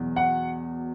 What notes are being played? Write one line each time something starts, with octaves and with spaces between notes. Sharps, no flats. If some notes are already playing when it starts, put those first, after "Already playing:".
Already playing: E2 B2 F#3 B3
F#5